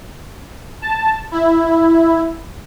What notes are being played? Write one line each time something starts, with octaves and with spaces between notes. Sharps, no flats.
A5
E4